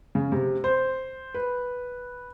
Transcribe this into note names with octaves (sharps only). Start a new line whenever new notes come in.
C#3
C3
C5
B4